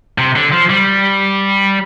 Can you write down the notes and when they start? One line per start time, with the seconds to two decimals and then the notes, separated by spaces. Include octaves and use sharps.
0.18 C3
0.36 D3
0.52 F3
0.70 G3